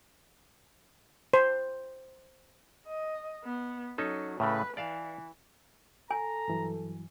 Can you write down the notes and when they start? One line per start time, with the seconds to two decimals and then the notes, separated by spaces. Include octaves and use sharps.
1.33 C5
2.86 D#5
3.44 B3
3.98 F#3 C#4 D#4 A4
4.40 A2 C#3 A3 B4
4.77 E3 D5 F5 A5
6.11 A4 G#5 A#5
6.48 G2 E3 F#3